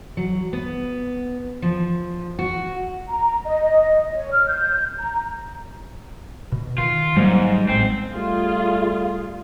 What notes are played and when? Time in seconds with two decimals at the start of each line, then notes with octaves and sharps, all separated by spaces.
0.17 F#3
0.53 B3
1.62 F3
2.39 F#4
3.08 A#5
3.45 D#5
4.12 C#5
4.31 F6
4.47 G6
4.99 A#5
6.52 B2
6.78 D#3 F4
7.17 G#2 F#3 G3 A#3
7.69 A1 C4
8.12 G3 A3 F4 G#4